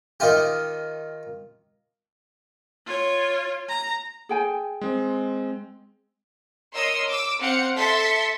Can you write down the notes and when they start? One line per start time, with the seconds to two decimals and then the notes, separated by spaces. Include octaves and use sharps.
0.20 D#3 D#4 F4 G4
2.86 F4 C#5
3.69 A#5
4.29 G#4 G5 G#5
4.81 G#3 C4
6.73 A#4 C#5 D#5 C6 D#6 E6
7.09 D6 E6
7.39 C4 F5 F#5 C#7
7.76 A4 E5 C6 A6 B6 C#7